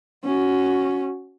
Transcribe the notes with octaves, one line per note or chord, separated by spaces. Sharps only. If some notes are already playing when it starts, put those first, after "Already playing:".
C#4 F#4